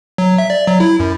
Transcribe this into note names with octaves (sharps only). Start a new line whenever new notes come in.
F#3
E5
D5
F#3
E4
F#2